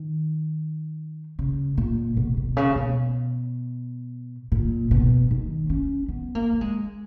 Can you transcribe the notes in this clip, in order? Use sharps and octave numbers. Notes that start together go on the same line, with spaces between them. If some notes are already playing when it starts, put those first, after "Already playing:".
Already playing: D#3
C#3
A#2
B2
B2
C#3
B2
A#2
B2
D#3
C#4
B3
A#3
A#3
G#3